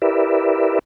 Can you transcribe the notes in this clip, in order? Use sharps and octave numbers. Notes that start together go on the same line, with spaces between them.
E4 G4 A#4 B4 D5 E5